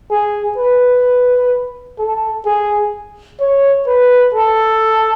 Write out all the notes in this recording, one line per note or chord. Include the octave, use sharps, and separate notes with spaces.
G#4
B4
A4
G#4
C#5
B4
A4